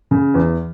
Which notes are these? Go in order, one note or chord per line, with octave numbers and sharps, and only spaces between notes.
C#3
E2